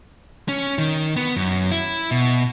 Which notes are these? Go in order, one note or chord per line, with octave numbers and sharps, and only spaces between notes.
C#4
D#3
B3
F#2
E4
B2